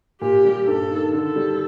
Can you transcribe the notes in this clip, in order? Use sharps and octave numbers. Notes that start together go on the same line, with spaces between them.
A#2 G4
G3
G2 A4
D#3
D3 A4
G3